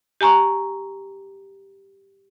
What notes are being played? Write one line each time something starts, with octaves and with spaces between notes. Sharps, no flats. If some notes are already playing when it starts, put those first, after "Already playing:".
G4 G#5 A#5 C#6